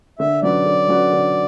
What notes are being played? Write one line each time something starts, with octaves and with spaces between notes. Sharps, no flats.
D3 E5
F#3 C#4 F#4 B4 D5
D3
F#3 C#4 F#4 B4
D3